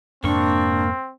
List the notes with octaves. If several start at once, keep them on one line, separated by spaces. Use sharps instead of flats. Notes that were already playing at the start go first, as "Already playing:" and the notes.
F2 G#2 C3 A#3 C4 D4 C#6